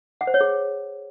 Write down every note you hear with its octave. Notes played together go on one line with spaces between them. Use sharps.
F#5
C5
C#5
G#4